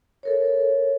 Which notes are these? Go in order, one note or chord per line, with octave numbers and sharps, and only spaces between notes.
A4 A#4 C#5